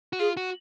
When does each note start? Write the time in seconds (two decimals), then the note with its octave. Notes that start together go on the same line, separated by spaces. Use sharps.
0.13 F#4
0.19 F4 G#4
0.37 F#4